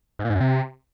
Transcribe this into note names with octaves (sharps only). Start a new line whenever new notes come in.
G#2
A#2
G#2
F#2
C3